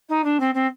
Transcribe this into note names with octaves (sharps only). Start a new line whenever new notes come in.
D#4
D4
C4
C4